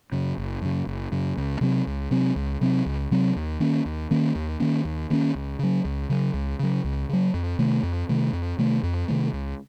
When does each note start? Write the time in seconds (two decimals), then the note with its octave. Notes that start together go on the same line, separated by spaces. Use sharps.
0.12 F#2 C#3
0.38 F#1
0.62 F#2 C#3
0.87 F#1
1.12 F#2 C#3
1.37 C#2
1.61 C3 F#3 C4
1.87 C#2
2.11 C3 F#3 C4
2.36 C#2
2.61 C3 F#3 C4
2.86 C#2
3.11 C3 F#3 C4
3.36 D#2
3.60 D#3 A#3 C#4
3.86 D#2
4.11 D#3 A#3 C#4
4.35 D#2
4.60 D#3 A#3 C#4
4.85 D#2
5.10 D#3 A#3 C#4
5.35 C#2
5.59 C#3 F#3
5.85 C#2
6.09 C#3 F#3
6.34 C#2
6.59 C#3 F#3
6.84 C#2
7.09 C#3 F#3
7.34 F2
7.59 C3 D#3 A3
7.83 F2
8.09 C3 D#3 A3
8.33 F2
8.58 C3 D#3 A3
8.83 F2
9.08 C3 D#3 A3
9.33 C#2